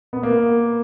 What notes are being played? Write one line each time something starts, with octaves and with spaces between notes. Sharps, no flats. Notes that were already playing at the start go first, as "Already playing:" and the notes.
B3
A#3